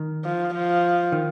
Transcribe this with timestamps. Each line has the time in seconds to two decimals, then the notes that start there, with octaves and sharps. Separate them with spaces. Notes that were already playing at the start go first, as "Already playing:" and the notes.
Already playing: D#3
0.25 F3
0.54 F3
1.12 D#3